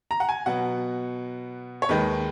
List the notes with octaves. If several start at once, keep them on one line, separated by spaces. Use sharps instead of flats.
A#5
F#5
G#5
B2 F#3 B3 F#5
C#5
D#2 D#3 G#3 B4